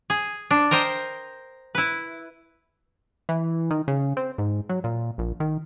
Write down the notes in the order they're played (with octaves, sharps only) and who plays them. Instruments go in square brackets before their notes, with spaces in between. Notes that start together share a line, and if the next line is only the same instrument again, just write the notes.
[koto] G#4
D4
A#4 C5 D#5 G5
E4 B4
[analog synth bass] E3
D#3
C#3
C4
G#2
F#3
A#2
A#1
D#3